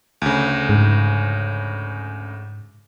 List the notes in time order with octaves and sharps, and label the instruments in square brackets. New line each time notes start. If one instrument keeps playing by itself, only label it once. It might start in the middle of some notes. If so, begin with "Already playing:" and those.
[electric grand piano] D2 C#3
[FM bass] G#2